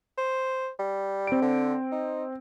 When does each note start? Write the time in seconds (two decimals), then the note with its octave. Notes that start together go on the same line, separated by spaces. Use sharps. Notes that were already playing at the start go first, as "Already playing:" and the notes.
0.17 C5
0.79 G3
1.27 C4 D7
1.42 D3
1.92 D#4